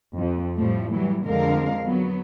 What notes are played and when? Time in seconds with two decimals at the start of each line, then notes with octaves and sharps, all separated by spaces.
0.17 F2
0.57 A2 F3 G3 A3
0.92 E3 F#3 G3
1.24 F2 D3 G#3 A#4 F5
1.87 F#3 B3